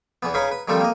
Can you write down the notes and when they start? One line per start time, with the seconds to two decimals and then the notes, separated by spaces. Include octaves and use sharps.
0.23 E2 E3 B3
0.34 C#3 C#4 D#4 B4 B5
0.52 B4
0.68 D#3 F3 G3 A3 C4 A4
0.81 A#3 D#5